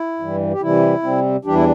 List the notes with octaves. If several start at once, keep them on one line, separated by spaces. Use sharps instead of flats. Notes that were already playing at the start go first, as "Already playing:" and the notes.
Already playing: E4
G2 E3 G3
G4
C3 E3 G3 E4
C3 G3 C4
E2 E3 G3 D4 G4
E4